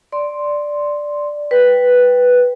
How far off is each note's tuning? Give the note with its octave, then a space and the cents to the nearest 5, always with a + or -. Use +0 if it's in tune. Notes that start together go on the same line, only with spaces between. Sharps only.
D5 +0 C6 +0
B4 +0 G5 +0